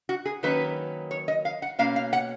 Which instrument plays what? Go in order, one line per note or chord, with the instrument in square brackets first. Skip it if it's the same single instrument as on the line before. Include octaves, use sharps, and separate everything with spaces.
[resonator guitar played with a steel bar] F#4
G#4
D#3 F#3 A#3 C#4 B4
C#5
D#5
F5
F#5
B2 A#3 C#4 F5
F5
F#5